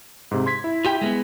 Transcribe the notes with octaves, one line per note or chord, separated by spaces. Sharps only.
G#2 C3
C6 G#6 B6
E4
F4 G4 G5
G#3 A#3 B3